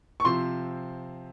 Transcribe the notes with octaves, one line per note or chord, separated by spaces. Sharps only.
C#6
C3 F3 C4 C6